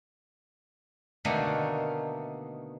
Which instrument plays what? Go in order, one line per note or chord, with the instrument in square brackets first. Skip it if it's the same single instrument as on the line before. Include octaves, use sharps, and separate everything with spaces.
[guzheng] B2 D3 D#3 A3 A#3